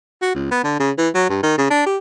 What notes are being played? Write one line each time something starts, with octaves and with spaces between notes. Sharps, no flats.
F#4
C#2
B3
D3
C#3
E3
F#3
G2
D#3
C#3
D4
G4